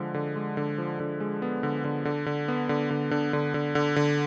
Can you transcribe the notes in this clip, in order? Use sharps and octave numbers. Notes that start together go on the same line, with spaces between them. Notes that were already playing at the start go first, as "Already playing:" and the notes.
Already playing: D3 F3 G#3
D3
G#3
D3
F3
D3
G#3
B3
D3
D3
D3
D3
B3
D3
D3
D3
D3
D3
D3
D3